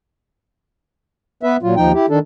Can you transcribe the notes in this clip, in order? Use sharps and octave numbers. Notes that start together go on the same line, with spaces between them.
B3 B4 E5
A#2 F#3 F4
D#2 F3 D#4 G5
E4 G4
D#3 D4 A4